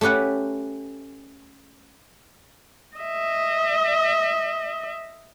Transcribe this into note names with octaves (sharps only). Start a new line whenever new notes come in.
A3 C#4 G4 B4 F#5
D#5 E5